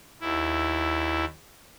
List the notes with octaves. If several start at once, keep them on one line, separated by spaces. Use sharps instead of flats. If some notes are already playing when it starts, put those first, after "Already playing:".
D#2 E4